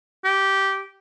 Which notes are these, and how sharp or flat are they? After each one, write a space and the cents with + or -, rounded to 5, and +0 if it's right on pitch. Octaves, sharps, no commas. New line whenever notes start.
G4 -10